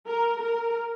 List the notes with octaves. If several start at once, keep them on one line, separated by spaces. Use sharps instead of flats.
A#4
A#4